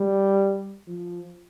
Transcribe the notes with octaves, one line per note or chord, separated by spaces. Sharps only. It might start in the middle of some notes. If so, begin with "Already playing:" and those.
Already playing: G3
F3